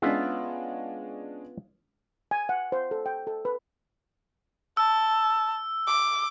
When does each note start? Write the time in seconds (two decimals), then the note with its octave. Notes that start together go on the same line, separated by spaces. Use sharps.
0.02 G#3 B3 C#4 D4 F4 E5
2.31 G#5
2.49 F#5
2.72 C5
2.91 A4
3.06 G5
3.27 A4
3.45 B4
4.77 A5 E6
5.87 D6